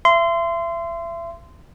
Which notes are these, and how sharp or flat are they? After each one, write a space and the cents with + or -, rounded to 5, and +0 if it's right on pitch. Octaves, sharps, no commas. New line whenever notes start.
E5 +35 C6 -20